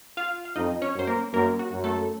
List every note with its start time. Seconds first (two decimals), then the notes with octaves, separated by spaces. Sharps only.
0.17 F4 F5
0.45 F5
0.56 F2 D#4 D#5
0.82 C#4 C#5
0.95 F#2 C5
1.07 A#3 A#4
1.34 F#2 A#3 A#4
1.59 F#4
1.71 F#2
1.84 A3 A4